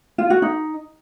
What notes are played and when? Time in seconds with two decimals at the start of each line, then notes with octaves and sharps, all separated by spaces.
0.18 F4
0.30 F#4
0.42 D#4